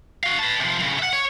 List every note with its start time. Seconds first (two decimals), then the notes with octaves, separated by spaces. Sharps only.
0.23 F#4 F5
0.39 B4 A5
0.60 C3 F3
0.82 A2 C#3
0.99 E5 F#5
1.13 C#5